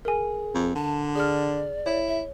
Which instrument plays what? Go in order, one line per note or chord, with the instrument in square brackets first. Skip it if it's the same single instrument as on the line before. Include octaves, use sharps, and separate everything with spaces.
[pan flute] G#4 [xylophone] A#4 G#5
[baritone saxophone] F2
[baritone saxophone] D3 [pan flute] A5
[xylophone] G#4 F6 [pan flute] D5
[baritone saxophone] E4 [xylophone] C#5
[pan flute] E5